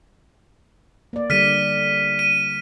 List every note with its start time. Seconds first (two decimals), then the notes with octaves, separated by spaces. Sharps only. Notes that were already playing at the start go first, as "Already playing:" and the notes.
1.13 A#3 D5
1.30 D3 G3 F6 B6 D#7
2.19 D#7